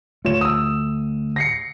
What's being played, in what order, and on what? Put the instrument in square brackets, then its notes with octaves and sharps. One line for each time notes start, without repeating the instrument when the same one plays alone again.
[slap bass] D3 A3 [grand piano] F4 C#5 E7
[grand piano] D#6 E6
A#6 C7 C#7